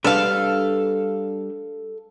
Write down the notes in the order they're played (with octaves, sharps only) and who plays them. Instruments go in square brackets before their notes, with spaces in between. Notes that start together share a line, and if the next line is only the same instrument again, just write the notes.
[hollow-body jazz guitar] G3 D4 B4 [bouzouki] A4 F5